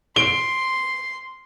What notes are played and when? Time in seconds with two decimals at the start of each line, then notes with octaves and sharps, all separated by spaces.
0.16 C6 D7 G7